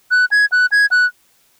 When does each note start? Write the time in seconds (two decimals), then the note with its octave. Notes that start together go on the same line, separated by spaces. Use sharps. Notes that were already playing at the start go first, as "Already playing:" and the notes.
0.11 F#6
0.31 G#6
0.52 F#6
0.72 G#6
0.91 F#6